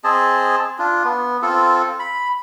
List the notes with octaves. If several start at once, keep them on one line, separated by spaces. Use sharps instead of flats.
C4 G#4 D#5 A5
D4 F4
B3
C4 F4 A4
B5